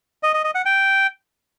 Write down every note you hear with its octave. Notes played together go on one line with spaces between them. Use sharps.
D#5
D#5
D#5
F#5
G5